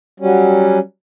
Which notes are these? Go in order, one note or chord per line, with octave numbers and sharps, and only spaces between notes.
F#3 G3 C#4